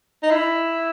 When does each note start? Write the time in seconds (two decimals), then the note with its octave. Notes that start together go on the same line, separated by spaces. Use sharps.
0.23 D#4
0.31 E4